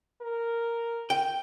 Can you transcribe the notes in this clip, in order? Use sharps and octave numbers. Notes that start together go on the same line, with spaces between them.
A#4
G5